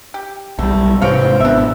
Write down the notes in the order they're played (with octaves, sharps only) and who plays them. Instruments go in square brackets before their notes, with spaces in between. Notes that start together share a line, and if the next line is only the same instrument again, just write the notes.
[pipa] G4
[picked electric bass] B1 G3 [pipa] A3
[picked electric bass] G#2 C3 [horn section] E3 C4 [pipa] C#5 F5
[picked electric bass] G#1 B2 [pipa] D4 E5